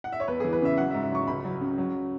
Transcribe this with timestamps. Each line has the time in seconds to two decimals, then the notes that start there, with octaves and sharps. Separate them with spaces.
0.04 F#5
0.12 E5
0.20 C#5
0.28 E2 B4
0.40 E3 G#4
0.53 B4
0.62 C#3 E5
0.78 F#3 F#5
0.91 E5
0.94 G#2
1.03 E5
1.11 F#3 C#6
1.27 C#2 B5
1.45 F#3
1.61 C#3
1.78 F#3